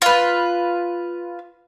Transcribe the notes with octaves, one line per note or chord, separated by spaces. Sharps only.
F4 B4